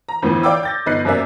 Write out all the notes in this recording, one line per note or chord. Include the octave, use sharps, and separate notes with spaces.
A#5
F2 A2 D3 E3 B3
C#5 D5 F5 G5 D6 E6
G6 A6 A#6
G1 D#4 B4 F#6 C7
F#2 C3 A#3 C#4 D5 E5